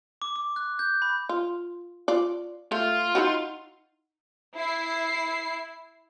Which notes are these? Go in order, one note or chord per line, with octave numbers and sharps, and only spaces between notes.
D6
D6
F#6
G6
B5
F4
F4 D5
A3 F4
D#4 E4 F#4
E4 C7